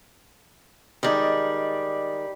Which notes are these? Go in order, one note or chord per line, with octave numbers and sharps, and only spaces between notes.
D#3 G3 G#3 D#4 D5